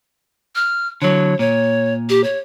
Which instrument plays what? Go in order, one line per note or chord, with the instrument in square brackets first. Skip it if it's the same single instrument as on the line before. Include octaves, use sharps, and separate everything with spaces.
[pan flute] F6
[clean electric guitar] D3 F#3 [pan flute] C#5
[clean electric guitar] A#2 [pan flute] C#5
[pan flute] G4
C#5